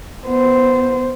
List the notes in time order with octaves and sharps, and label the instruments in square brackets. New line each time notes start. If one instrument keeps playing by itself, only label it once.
[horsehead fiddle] B3 C5